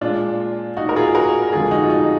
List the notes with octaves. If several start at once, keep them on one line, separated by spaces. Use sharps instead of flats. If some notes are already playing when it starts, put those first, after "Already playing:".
A#2 G#3 D4 F4
D#4 F#4
A#4
F4 G#4
F#4 A#4
F2 D3 G#3 F4 G#4
D#4 F#4
F4
D#4